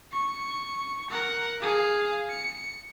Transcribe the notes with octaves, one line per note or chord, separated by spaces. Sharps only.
C#6
A#4 F#5
G#4 F5
C#7